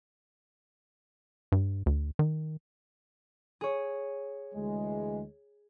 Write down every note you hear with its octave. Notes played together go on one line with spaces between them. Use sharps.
G2
D2
D#3
G#4 C#5
D2 E3 G#3